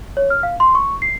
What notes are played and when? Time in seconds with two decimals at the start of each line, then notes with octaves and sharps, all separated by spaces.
0.17 C#5
0.30 F6
0.43 F5
0.60 C6
0.75 C#6
1.02 C7